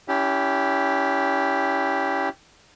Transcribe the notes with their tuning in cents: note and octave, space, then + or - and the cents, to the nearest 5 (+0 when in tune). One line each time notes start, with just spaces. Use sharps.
C#4 +35 E4 +0 G4 +0